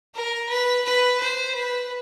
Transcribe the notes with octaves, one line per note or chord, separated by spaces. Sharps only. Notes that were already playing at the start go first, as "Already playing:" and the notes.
A#4
B4
B4
C5
B4